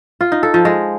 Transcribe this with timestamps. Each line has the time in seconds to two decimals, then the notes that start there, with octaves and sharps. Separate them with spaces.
0.21 F4
0.32 D#4
0.43 A4
0.54 F3
0.65 G#3